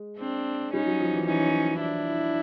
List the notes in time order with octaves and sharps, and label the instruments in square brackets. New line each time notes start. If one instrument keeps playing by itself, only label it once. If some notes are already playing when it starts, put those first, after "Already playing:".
Already playing: [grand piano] G#3
[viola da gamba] C4 D4
[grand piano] G3 [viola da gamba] C#4 D#4
[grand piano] F#3
F3
E3
[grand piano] E3 [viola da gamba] C#4 D#4
[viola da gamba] D4 E4